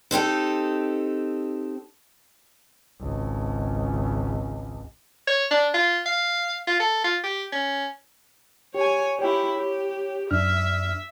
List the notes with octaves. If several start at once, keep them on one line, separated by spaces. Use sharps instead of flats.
C4 D#4 G4 A4
G#1 C#2
C#5
D4
F4
F5
F4
A4
F4
G4
C#4
G4 C#5 G#5
E4 G4 C#5 G5
G4
F#2 D4 E5 F6